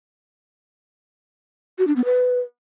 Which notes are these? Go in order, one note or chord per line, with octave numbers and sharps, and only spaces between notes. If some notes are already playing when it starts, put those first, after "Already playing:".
F#4
D4
B3
B4